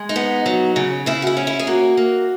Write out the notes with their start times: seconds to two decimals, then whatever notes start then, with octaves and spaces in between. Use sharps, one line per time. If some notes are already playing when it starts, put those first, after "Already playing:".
Already playing: G#3
0.09 D#4
0.16 B3
0.46 F#3
0.76 C#3
1.06 C#3 E4
1.22 F#4
1.27 E4
1.37 C#4
1.47 E4
1.59 G#4
1.67 A#3 F#4
1.97 A#3